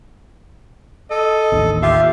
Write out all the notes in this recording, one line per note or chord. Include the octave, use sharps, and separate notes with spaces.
A4 D#5
A1 D#2 D3
F4 G4 E5 F5